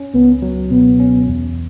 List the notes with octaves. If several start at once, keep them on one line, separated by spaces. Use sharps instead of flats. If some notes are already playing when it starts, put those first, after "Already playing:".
Already playing: C#4
C#2 B3
F#3
B2 B3
C#4
E2